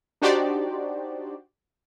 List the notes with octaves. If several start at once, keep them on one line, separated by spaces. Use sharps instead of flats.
D4 D#4 F#4 G4 C5 D5